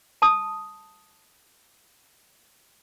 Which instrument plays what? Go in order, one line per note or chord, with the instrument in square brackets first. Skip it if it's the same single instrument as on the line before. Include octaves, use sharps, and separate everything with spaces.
[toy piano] A5 D#6